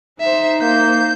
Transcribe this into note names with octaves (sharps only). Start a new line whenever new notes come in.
D#4 C5 E5
A#3 G6